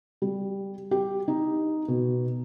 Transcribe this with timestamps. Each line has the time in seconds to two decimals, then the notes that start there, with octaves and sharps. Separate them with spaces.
0.22 G3
0.91 G4
1.28 D#4
1.88 B2